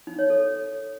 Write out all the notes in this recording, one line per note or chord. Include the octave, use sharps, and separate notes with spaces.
D#4
C#5
A4